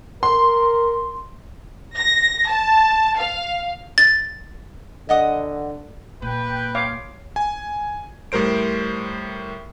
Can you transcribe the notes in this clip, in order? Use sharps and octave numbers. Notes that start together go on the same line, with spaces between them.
A#4 C6
A#6
A5
F5
A6
D3 D#5 F#5 D#6
A#2 B4 G5
C#5 F5 D6
G#5
A2 G3 A#4 C5 D7